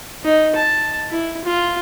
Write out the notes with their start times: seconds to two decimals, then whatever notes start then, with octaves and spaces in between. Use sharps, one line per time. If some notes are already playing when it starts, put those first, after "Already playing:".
0.25 D#4
0.56 A5
1.10 E4
1.45 F4